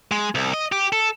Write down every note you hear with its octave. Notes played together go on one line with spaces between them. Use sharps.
G#3
C2
D#5
G4
A4